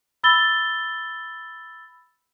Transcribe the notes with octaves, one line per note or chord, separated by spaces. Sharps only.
B5 E6 A6 G7